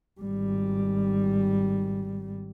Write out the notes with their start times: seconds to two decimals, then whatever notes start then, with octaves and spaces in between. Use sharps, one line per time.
0.21 G#1 G3